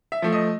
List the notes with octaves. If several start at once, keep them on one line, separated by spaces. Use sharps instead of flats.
E5
F3 A3
D#5